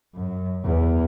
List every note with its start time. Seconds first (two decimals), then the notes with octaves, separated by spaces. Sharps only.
0.14 F#2
0.64 E2